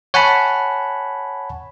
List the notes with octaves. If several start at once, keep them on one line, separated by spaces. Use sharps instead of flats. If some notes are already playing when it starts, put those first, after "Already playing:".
C#5 F#5 G#5 A5 B5